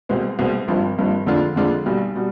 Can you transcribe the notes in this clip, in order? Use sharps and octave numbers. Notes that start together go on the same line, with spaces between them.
C2 B2 G#3 C4
C2 B2 G#3 C4
G#1 G2 F3
G#1 G2 F3
F2 D3 G#3 D4 F4
F2 D3 G#3 D4 F4
B1 B2 G3
B2 G3